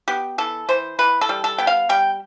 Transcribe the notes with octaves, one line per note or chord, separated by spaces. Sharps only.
B3 G4
E3 A4
E3 C5
E3 B4
A4
G3
A4
B3 G5
F5
G3 G5